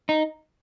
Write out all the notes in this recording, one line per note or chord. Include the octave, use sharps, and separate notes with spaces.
D#4